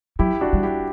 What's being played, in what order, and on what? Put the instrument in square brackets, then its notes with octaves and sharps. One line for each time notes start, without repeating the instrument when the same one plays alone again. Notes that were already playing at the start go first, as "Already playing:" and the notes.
[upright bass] F#3 [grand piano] E4 G4
[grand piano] D4 F#4
[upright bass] G3
[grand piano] E4 G4